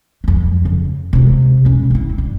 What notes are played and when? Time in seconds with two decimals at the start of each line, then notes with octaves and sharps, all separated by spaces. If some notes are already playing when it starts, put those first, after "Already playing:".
0.24 F2 F#3
0.65 C#3
1.13 C3 G#3
1.65 E1 C#4
1.90 C4 E4
2.18 G2